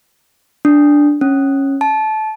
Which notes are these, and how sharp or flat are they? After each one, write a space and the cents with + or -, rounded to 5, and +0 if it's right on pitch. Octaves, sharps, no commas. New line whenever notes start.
D4 -5
C#4 -15
A5 -20